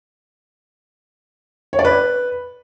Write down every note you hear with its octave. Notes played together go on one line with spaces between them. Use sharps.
C#5
D5
B4